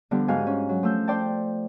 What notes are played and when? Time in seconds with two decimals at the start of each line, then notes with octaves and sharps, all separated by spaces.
0.11 D3 F3 G3 B3
0.28 G#2 F#4 C5 F5 G#5
0.47 C#4
0.69 F#3
0.83 F3 A3 E6 G6
1.07 C5 D5 G5 A5